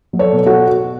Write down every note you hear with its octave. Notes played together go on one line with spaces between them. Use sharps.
F#3
A4 C#5
B2
F#4 A4